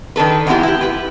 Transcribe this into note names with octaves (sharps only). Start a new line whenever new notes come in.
D#3 D4 A4 B4
E3 G3 G#3 B3 E4 G4
E4 G4
G4 B4